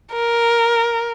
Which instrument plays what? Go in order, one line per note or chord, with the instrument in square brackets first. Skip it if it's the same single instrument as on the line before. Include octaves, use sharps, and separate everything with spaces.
[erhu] A#4